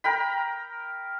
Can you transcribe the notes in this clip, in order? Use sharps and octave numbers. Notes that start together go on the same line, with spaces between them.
A#4 G5 B5